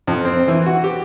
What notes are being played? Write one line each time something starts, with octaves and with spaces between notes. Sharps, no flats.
F2
C4
E3
F#4
G4